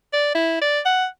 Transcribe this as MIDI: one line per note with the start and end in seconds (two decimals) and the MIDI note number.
0.13 0.34 74
0.35 0.58 64
0.61 0.80 74
0.85 1.06 78